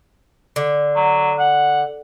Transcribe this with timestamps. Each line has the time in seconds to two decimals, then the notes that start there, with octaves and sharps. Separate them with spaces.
0.56 D3
0.96 F#3
1.39 F#5